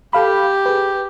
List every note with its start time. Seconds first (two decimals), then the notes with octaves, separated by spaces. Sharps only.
0.13 G4 A4 F5 B5
0.66 G#4 B4